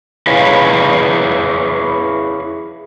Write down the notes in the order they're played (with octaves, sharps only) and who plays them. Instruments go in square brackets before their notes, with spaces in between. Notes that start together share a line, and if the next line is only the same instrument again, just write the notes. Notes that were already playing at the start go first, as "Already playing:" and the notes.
[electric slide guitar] E4 G#4 B4 C#5 D#5 F5